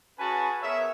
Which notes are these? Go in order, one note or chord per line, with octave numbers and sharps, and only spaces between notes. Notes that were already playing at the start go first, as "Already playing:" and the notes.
C#4 F#4 G#4 B4 G#5 A5
B3 G#4 A#4 C#5 E5